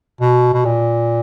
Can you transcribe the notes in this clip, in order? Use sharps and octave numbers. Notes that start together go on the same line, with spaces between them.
B2
B2
A#2